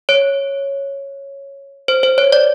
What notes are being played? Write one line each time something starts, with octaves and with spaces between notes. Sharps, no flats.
C#5
C5
C5
C#5
D5